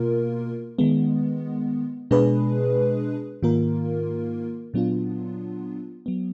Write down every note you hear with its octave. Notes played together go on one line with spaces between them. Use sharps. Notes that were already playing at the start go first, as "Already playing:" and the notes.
Already playing: B2 A#3 F4 A#4
D#3 G#3 B3
B2 G#3 D4 G#4 B4
G#2 D#3 A#3 F4 A#4
A#2 F#3 B3 D4 F4
F#3 B3